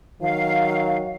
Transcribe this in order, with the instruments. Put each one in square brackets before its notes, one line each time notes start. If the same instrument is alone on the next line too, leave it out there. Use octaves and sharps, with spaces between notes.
[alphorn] D#3 [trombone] F#3 [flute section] F5